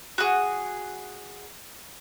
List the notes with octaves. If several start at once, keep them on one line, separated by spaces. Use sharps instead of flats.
F#4 G#4